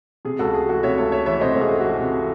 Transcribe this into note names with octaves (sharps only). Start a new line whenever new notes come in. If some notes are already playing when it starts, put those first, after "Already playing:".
C3 G#4
C#2 F#4 A4
A3 G#4
E3 F#4
C3 C#5 E5
C#2 A4 C#5
A3 C#5 E5
E3 C#5 E5
C3 C5 D#5
C#2
G#4
A3
E3 F#4
C3